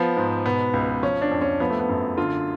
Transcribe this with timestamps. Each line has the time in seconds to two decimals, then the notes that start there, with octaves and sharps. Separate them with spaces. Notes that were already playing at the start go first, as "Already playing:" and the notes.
Already playing: F3 B3
0.17 G#2
0.46 B2 B3
0.73 C#2
1.03 F3 C#4
1.22 D4
1.31 F2
1.42 C#4
1.60 F3 B3
1.70 A3
1.80 B3
1.89 F#2
2.17 D3 F4